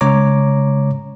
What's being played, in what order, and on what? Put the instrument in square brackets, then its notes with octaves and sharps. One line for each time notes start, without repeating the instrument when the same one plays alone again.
[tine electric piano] C#3 G#3 C#5 A#5 D6